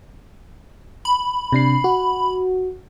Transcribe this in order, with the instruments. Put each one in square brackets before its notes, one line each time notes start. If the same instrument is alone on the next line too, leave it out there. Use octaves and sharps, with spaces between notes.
[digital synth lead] B5
[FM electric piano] C3 D4 C7
F#4